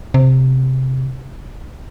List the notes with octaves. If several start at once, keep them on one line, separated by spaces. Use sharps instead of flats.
C3